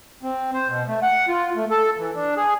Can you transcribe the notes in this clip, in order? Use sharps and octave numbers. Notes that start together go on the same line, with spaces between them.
C4
C5
B2
A3
F#5
F4
A3
A4
E3
D4
G#4